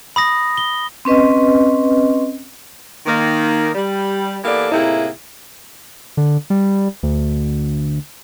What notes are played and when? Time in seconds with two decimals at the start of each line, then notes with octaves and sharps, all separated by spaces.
0.16 B5 D#6 A#6
0.57 G7
1.05 C4 C#4 B4 D#5
3.06 D#3 A#3
3.75 G3
4.43 E3 A#3 B3 G4 A4 D5
4.71 A2 C3 A#3 D#4 E4 G#4
6.17 D3
6.50 G3
7.03 D2